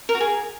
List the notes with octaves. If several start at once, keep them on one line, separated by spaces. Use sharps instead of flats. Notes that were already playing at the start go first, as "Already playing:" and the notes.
A#4
F#4
G#4